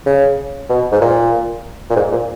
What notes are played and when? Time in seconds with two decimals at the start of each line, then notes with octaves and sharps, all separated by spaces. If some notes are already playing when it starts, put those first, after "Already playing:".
0.06 C#3
0.70 B2
0.92 G#2
1.01 A#2
1.90 A#2
1.96 G#2
2.12 A#2